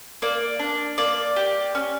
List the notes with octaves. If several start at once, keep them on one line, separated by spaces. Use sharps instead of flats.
A#3 D5
D4
A#3 D5
G4
C#4